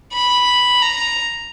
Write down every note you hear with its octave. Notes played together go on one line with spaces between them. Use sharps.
B5
A#5